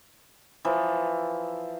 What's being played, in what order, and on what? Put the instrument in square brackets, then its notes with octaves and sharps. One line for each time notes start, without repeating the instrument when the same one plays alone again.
[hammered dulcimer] E3 F3 A5 A#5